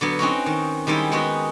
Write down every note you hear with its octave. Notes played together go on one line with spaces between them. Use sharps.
D3 F#3 B3
C4 C#4 D#4 F#4
D#3
D#3 G3 G#3 D#4 E4
G#3 B3 D#4 F#4